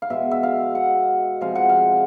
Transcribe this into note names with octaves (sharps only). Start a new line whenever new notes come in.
F5
B2 G#3 E5
E5
F5
F#5
C3 F3 G#3 F5
F#5
F5